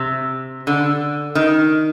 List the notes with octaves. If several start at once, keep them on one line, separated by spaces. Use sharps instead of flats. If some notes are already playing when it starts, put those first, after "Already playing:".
Already playing: C3
D3
D#3